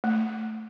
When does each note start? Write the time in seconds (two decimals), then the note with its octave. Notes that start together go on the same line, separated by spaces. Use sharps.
0.04 A3